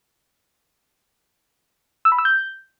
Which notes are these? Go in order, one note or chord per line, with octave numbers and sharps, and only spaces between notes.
E6
B5
E6
G6